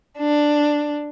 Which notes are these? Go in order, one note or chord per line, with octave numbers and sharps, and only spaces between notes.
D4